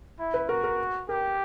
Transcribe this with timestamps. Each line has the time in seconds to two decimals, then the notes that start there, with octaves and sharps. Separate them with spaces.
0.19 E4
0.34 B4
0.49 F#4 A#4
0.64 A#4
1.09 G4 A#4